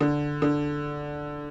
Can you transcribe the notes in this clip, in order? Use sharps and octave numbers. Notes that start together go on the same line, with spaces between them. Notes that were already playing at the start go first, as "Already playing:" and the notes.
D3
D3